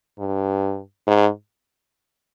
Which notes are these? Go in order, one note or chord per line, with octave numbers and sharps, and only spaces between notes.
G2
G#2